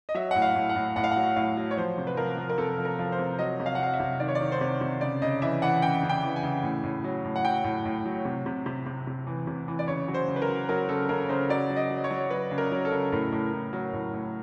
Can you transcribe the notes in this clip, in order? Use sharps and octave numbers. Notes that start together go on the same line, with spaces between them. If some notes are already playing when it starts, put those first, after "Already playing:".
D#5
F#3 E5
A2 F#5
F5
A2
F#5
A2
A2 F#5
F5
F#3 F#5
A2 F5
F#3
C#5
F3 C5
C3
B4
F3 A#4
F3
A#4
C3 A4
F3
A#4
F3
C5
C3
F#3 D#5
C3
F5
F#5
F#3 F5
E5
C3
D#3 D5
C#5
D5
D#3
C5
C3 C#5
C3
C#3 D5
C#3 D#5
E3 E5
E3 F#5
C#3 G5
C#3
G5
E3
G#5
C#3
A2
A2
F#3
A2
F#5
F#3 G5
A2
A2
F#3
C3
C3
C3
C3
C3
E3
C3
E3
D5
C#3 C#5
F#3
C5
C#3
B4
A#4
F#3
F#3 A#4
C#3 A4
C#3 A#4
C#3 C5
F#3 D5
F#3
D#5
F#3
C#5
F#3
F#3 B4
C#3
A#4
F#3
A4
C#3
A2 A#4
A2
A2
F#3
A2
A2